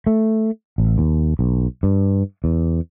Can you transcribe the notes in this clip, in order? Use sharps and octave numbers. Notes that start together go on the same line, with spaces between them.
A3
A1
D#2
B1
G2
E2